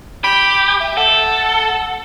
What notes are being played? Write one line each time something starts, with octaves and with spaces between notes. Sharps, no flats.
G4 B5
E5
A4 F#5